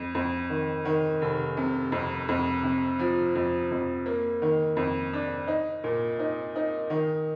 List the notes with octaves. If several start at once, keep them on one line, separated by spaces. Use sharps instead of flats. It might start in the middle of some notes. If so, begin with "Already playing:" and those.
Already playing: F2
F2
D#3
D#3
F1
C3
F2
F2
C3
F3
F2
F2
A#3
D#3
F2
D4
D#4
A#2
D#4
D#4
D#3